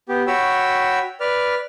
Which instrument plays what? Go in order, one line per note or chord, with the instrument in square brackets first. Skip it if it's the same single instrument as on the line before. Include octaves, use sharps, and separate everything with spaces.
[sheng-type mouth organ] B3 G4
F#4 C#5 G5 B5 E6
B4 D5 F6